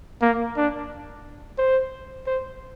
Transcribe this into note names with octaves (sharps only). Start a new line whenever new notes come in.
A#3
D4
C5
C5